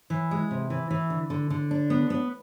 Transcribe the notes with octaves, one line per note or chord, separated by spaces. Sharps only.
E3
G#3
C3
E3
E3
D3
D3
D3
D4
B3
B3